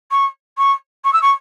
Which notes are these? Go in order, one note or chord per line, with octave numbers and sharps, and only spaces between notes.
C#6
C#6
C#6
E6
C#6